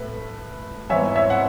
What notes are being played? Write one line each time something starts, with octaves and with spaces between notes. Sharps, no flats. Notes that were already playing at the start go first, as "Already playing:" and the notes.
Already playing: A2 A3 B4
G#2 E3 B3 C#5 E5
C#5 E5
F#5